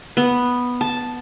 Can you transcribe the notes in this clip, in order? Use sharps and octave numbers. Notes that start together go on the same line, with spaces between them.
B3
A5